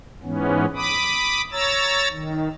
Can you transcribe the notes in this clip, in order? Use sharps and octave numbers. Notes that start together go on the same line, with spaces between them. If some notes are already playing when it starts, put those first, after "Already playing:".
G#2 E3 B3 C#4
B5 D6 D#6
C#5 A#5 E6 A6
D#3